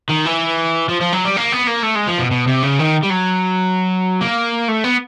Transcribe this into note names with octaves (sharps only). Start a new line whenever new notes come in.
D#3
E3
F3
F3
F#3
G3
A#3
B3
A#3
A3
G#3
F3
B2
B2
C3
C#3
D#3
G3
F#3
A#3
A3
B3